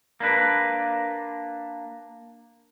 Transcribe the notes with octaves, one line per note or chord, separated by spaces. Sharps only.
A#3 D4 B4